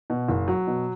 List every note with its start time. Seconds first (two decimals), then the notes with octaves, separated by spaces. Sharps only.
0.10 B2
0.28 F#1
0.48 F#3
0.67 B2